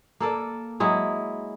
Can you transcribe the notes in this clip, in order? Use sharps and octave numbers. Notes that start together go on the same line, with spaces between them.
A#3 A4 D5
F#3 G#3 E4